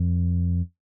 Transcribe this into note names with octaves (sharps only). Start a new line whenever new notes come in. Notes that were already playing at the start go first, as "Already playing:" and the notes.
Already playing: F2